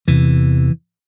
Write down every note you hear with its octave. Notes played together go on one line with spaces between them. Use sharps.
E2 C3 E3